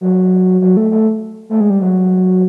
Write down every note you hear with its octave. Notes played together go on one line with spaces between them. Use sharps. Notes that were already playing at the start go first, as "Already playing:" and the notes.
F#3
F#3
A3
A3
A3
G#3
G3
F#3